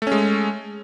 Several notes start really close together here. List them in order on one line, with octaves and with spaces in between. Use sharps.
A3 C#4 G#3